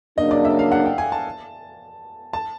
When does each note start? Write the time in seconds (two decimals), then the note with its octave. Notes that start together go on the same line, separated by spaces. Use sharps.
0.18 C#3 F#3 A#3 D4 D#5
0.31 D5
0.45 E5
0.59 F5
0.72 F#5
0.86 G5
0.98 G#5
1.12 A5
2.33 A5